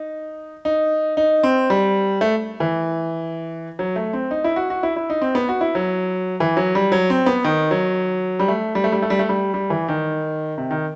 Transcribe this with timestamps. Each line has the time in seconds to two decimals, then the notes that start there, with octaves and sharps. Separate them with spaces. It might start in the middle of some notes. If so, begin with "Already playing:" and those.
Already playing: D#4
0.65 D#4
1.17 D#4
1.43 C4
1.70 G3
2.21 A3
2.60 E3
3.79 F#3
3.96 A3
4.13 C4
4.31 D#4
4.44 E4
4.56 F#4
4.70 F#4
4.83 E4
4.96 E4
5.10 D#4
5.22 C4
5.35 B3
5.49 F#4
5.61 E4
5.75 F#3
6.40 E3
6.57 F#3
6.75 G3
6.92 F#3
7.10 C4
7.26 B3
7.44 D#3
7.71 F#3
8.39 G3
8.48 A3
8.75 G3
8.84 A3
8.92 G3
9.02 A3
9.10 G3
9.19 A3
9.29 G3
9.54 G3
9.70 E3
9.88 D#3
10.58 C3
10.71 D#3